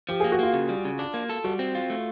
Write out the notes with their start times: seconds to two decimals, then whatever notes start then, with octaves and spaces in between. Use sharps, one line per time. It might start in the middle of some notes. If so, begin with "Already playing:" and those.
0.09 F3 G4
0.20 A#3 G#4
0.32 F#4
0.39 A#3 F4
0.53 C#3
0.69 G3
0.85 C#3
0.99 D4
1.14 A#3
1.29 A4
1.44 G3 F#4
1.59 C4
1.75 F4
1.90 A3